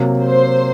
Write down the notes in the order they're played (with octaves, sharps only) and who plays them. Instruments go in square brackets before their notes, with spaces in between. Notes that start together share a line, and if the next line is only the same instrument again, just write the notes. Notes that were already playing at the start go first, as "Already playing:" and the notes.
Already playing: [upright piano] C3 F#3 A#3
[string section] C5